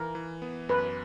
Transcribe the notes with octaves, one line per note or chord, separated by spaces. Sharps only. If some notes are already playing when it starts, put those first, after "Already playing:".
Already playing: E3 A#4
E3
B3
F#2 B4